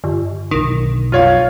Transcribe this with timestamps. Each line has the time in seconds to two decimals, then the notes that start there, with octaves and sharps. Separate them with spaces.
0.04 G1
0.51 B1 D3 D#3
1.12 B1 F2 F4 C#5 F5